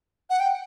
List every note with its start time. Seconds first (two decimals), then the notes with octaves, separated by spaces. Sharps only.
0.30 F#5
0.40 G5